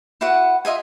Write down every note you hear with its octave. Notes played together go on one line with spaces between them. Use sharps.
E4 F#4 B4 F#5
F4 D#5 E5 G#5